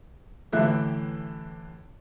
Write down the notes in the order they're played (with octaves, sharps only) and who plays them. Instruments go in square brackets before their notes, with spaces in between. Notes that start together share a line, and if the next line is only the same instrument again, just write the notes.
[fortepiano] A1 A2 D3 E3 E5 F#6